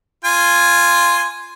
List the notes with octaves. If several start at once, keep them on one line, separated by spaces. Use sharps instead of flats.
F4 G#5 C6